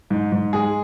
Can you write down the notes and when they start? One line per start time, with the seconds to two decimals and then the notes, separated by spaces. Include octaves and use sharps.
0.10 G#2
0.32 G#2
0.53 G#3 G#4